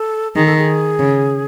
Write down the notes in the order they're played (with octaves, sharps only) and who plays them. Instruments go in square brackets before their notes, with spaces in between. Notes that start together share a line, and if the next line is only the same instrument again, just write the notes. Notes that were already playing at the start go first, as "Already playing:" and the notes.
Already playing: [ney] A4
[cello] D#3 [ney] G#4
[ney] A4
G#4
[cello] C#3